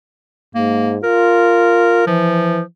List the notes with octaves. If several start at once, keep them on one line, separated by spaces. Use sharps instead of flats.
G#2 A#3
F4 A#4
E3 F3